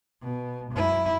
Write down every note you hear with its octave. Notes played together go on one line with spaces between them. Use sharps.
B2
F#2 E4